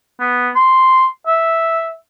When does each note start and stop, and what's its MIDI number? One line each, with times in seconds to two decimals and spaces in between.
0.20 0.49 59
0.55 1.06 84
1.27 1.90 76